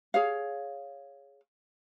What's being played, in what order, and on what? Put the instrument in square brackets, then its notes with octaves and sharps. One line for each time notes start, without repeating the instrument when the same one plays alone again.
[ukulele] G#4 C#5 F5